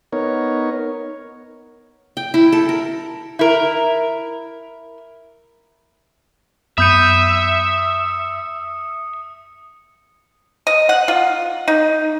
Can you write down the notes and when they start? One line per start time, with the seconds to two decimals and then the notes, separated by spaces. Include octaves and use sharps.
0.13 B3 D#4 A#4 C#5
2.17 G5
2.34 E4
2.52 A4
2.69 A#4
3.39 E4 A#4
6.78 F#2 B3 E5 B5 D#6 G6 C#7 D#7
10.67 D#5
10.89 F#5
11.08 F4
11.68 D#4